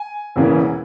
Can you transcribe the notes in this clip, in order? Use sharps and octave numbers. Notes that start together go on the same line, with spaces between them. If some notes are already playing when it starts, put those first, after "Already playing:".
Already playing: G#5
E1 E2 C#3 E3 A#3